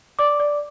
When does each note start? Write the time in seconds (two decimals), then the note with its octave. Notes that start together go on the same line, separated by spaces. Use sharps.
0.19 D5 D6
0.40 D5